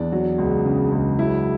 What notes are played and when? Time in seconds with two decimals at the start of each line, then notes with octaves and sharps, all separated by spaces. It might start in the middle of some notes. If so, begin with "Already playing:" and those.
Already playing: E2 D4
0.12 F#3
0.38 C#2
0.65 C#3
0.92 C#2
1.19 F#3 E4